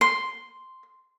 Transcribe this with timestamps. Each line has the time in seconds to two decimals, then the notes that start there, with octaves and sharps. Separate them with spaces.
0.01 C6